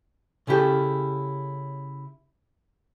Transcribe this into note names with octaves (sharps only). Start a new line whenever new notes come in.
C#3 C#4 E4 G4 A4